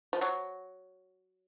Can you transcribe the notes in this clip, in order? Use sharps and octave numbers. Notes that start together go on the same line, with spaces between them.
F3
F#3